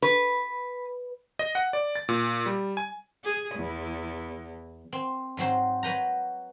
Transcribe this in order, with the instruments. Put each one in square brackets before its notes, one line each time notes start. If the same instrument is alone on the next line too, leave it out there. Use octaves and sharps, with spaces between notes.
[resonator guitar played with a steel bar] B4
[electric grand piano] D#5
F#5
D5
A6
A#2
G3
G#5
[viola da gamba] G#4
E2
[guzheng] C4
G#2 F#3 C4 C5
F#3 B4 G5 A#5